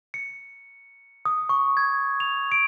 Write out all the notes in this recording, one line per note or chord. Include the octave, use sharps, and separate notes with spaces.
C#7
D#6
C#6
G#6
F7
D7